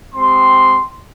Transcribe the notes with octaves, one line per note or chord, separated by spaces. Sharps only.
G#3 C4 G4 C6